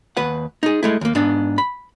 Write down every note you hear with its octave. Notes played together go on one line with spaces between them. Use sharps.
D#2 B4 F#5
D#4 G#4
G#3 A3 E4
D#2 A#3
G#2 B3 D4
B5